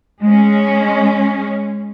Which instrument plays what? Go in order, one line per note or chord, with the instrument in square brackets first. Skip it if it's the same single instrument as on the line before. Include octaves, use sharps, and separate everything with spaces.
[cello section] G#3 C#4